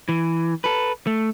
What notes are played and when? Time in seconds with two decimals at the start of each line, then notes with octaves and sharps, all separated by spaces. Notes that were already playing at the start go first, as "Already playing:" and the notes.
0.09 E3
0.64 A4 B4
1.07 A3